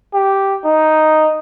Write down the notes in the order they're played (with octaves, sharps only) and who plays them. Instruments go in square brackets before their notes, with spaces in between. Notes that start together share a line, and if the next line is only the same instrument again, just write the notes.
[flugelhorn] G4
D#4